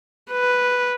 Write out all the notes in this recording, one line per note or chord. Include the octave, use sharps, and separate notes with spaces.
B4